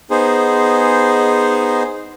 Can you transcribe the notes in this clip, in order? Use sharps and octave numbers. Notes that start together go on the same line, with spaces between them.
B3 D#4 G#4 C5